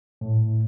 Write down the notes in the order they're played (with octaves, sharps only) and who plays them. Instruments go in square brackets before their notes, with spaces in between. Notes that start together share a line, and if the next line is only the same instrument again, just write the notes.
[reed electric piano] A2